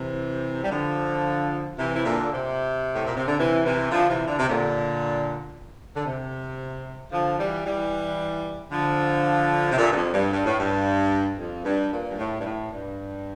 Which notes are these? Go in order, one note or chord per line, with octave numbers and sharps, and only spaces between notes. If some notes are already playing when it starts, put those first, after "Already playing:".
Already playing: C3 E3
G3
D3 F3
C3 E3
E3
A#2 D3
C3
A2
A#2
C3
D3
C3 E3
C3 E3
D3 F3
C3 E3
D3
C3
A#2 D3
D3
C3
D3 F3
E3 G3
E3 G3
D3 F3
C3
A#2 D3
G2
F2
G2
G2
A2
G2
F2
G2
A#2
G2
A2
G2
A2
G2